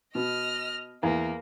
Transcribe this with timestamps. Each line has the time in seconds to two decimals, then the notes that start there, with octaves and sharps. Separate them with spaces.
0.15 B2 D#5 F6
1.03 E2 A#3